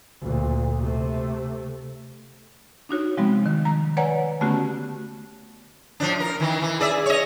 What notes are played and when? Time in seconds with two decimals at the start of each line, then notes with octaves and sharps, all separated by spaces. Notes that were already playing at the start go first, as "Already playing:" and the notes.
0.21 D2 A#2
0.79 C3 A3
2.89 D4 D#4 F#4 C#5
3.17 C3 F3 G3 G#3 B3 C4
3.46 D#3
3.65 A#5
3.97 B4 C#5 D5 F#5 G#5 A#5
4.41 D3 A3 B3 C#4 F#4 G4
6.00 A2 F3 D4
6.20 A#4
6.40 D#3 E3
6.62 E3
6.80 G#4 D5 E5
7.06 C#5 D#5